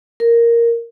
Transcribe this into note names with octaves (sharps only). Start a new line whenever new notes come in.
A#4